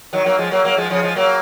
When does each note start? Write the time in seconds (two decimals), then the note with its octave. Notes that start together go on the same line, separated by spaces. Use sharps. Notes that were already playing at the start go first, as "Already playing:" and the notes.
0.13 D#3 F#3
0.26 F#3 A#3
0.38 F3 G#3
0.51 F#3 A#3
0.65 F#3 A#3
0.77 F3 G#3
0.90 C#3 F3
1.03 F3 G#3
1.16 F#3 A#3